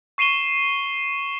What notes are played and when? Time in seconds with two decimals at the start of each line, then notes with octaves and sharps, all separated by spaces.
0.18 C#6 C7 D#7 E7 G7